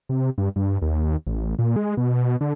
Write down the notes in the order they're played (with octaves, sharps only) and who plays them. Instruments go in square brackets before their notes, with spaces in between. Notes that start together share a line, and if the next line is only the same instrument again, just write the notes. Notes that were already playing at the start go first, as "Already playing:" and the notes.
[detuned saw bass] C3
G2
G2
D#2
A1
A#2
G#3
B2
D3